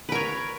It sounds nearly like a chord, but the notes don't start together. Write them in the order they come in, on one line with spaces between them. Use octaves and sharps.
B4 A#4 C#5